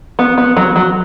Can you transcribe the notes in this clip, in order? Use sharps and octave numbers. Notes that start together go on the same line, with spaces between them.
B3
B3
F#3
F#3